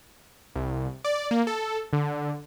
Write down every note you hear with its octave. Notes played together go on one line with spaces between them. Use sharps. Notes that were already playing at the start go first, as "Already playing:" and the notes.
C2
D5
A#3
A4
D3